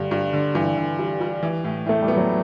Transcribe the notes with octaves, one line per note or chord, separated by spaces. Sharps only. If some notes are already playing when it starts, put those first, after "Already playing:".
Already playing: G2 D3 G3
G2
D3
G2 E3
D3
G3
G3
E3
A2
A2 A3
G3
B3
F#3